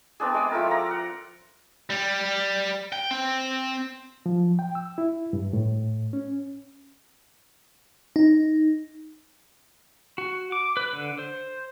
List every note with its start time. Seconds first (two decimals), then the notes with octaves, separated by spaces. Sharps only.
0.20 B3 C4 D4 G#4
0.34 G#3 D5
0.51 F3 A3 A#4
0.70 D5 A#5
0.91 F#5
1.90 G3
2.93 G5
3.11 C4
4.26 F3
4.59 G5
4.75 E6
4.98 E4
5.33 G2
5.53 A2
6.13 C#4
8.16 D#4
10.18 F#4
10.52 D6
10.77 B4
10.93 D3
11.19 C5